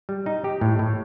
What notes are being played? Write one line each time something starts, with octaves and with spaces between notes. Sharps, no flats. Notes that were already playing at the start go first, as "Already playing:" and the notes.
G3
D#4
G4
A2
A2